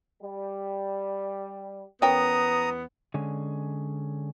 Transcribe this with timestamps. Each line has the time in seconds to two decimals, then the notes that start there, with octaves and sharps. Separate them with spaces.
0.21 G3
2.02 E2 B3 C#4 A#4 G5 A#5 D#6
3.14 D3 G#3 C#4